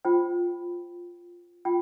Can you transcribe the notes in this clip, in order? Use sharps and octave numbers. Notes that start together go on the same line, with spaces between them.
F4 C5 G5
F4 G5